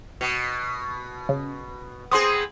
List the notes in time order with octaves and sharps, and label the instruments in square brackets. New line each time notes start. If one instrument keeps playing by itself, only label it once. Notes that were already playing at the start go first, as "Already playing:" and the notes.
[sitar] B2 [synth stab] C#7
[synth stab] C#3
[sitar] B3 C4 G#4 [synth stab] C6 D#6